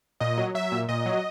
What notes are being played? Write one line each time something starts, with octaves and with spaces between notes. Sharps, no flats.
A#2 D#5
F#3
F#3 E5
A#2
A#2 D#5
F#3